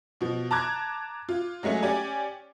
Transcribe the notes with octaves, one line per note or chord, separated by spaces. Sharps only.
B2 F3
A5 A#5 D6 F#6 G#6
F4
F#3 G#3 A3 C#4 G#4
C#4 G4 D5 G#5